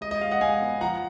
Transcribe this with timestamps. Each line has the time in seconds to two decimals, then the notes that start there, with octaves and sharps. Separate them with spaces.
0.01 G#3 D#5
0.11 D#5
0.21 G#3 F5
0.31 D#5 F#5
0.41 G#3 F5 G#5
0.62 B3
0.81 F3 F#5 A#5